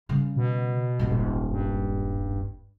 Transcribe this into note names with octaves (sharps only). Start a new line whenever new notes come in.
C#3 G3
B2
D#1 G#1
G2